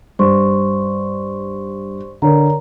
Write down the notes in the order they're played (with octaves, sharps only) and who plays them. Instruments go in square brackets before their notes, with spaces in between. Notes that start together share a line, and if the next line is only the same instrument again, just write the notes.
[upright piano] G2 [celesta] C5 C6 C#6
[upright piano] D3 [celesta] A#4 C#5 A#5